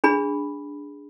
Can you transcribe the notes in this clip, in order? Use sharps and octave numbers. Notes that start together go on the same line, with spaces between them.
D4 G#4 B5